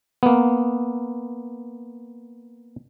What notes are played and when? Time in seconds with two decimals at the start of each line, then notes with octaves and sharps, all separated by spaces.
0.23 A#3 B3